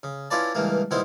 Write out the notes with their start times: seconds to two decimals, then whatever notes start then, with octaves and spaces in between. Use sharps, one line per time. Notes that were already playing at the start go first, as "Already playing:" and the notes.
0.03 C#3
0.31 C#4 E4 F4 B4 D5 A5
0.55 C#2 G2 E3 A#3
0.91 C2 A#2 D#3 B3 E4 C5